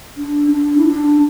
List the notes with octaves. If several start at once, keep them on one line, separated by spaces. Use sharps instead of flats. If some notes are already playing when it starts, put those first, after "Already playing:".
D4
D4
E4
D4